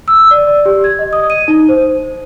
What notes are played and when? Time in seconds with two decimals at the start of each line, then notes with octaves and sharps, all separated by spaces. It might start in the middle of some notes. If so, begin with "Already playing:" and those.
0.08 E6
0.31 D5
0.47 D5
0.66 G4
0.84 G#6
0.99 D#5
1.13 D#6
1.30 D#7
1.48 D#4
1.69 C5